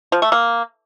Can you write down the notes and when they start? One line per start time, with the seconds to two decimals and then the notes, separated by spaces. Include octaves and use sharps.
0.12 F3
0.22 A3
0.32 A#3